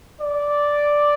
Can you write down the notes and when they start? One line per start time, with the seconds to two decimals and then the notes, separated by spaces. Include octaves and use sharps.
0.21 D5